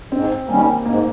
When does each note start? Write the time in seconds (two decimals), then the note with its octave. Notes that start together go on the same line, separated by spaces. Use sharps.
0.12 G#2 C4
0.48 D#3 G3 A#3 C#4
0.86 G#2 A#3